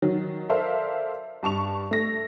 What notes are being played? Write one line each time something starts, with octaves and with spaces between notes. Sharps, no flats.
D#3 F#3
A4 A#4 C5 D5 E5 F5
G2 A5 C#6 F7
A3 A#6